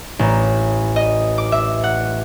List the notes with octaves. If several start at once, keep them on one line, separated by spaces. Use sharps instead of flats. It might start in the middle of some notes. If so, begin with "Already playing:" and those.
A1
D#5
D6
E5
F#5